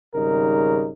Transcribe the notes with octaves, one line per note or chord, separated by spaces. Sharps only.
G#1 C#3 G3 D#4 A#4